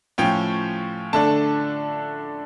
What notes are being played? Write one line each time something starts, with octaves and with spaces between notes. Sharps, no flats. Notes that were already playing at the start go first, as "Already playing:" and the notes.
A2 F3 C#4 G5
D3 A3 D4 A5